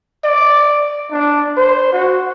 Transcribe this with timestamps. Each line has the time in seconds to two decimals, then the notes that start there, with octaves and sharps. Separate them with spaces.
0.24 D5
1.11 D4
1.57 C5
1.92 F#4